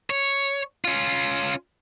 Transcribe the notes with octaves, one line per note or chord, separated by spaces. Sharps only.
C#5
C#4 F4